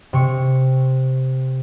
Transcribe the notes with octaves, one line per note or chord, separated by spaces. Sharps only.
C3 C#6